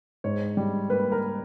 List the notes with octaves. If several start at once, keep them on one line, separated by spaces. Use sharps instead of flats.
G#2 C#5
G3
A#3 B4
A#4